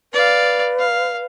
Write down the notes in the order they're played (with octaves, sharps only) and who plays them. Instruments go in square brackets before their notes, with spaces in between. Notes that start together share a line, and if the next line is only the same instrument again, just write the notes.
[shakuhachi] B4 [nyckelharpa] D5 F5
[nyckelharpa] F5